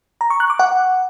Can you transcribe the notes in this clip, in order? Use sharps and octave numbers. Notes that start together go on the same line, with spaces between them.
A#5
C#6
F#6
D6
F#5